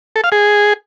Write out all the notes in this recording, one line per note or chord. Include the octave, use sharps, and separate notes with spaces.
A4
F5
G#4